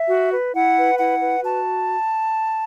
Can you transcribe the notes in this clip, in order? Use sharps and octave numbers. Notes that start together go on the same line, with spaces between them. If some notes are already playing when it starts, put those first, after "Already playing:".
Already playing: E5
F#4
B4
E4 F#5
B4
E4 F#5
B4
F#4 A5